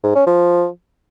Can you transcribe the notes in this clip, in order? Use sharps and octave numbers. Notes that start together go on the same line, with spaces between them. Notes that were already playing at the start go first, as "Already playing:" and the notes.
G#2
C#4
F3